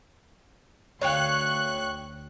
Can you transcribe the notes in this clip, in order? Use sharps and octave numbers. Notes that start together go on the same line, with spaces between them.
D2 C#5 F5 G5 C#6 F#6